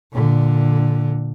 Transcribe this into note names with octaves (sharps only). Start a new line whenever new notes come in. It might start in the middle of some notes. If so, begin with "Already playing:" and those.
A#2 D3